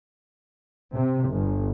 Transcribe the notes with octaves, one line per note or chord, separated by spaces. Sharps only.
C3
G1